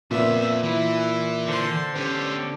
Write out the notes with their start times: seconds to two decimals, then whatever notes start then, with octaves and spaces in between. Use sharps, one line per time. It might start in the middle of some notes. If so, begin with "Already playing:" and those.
0.11 F2 A#2 B3 F4 E5
0.63 E3 E4
1.48 D3 C5 C6
1.96 B3 C#4 G4 C5